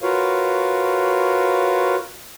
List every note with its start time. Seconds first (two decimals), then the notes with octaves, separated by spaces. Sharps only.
0.02 F4 F#4 A#4 B4 C#5 F5